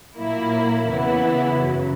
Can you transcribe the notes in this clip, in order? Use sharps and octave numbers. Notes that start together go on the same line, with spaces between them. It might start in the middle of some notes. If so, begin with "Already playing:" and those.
A#2 F#3 A#3 E4 A#4
E2 C#3 E3 B3 E4
F#2 C#3 F#3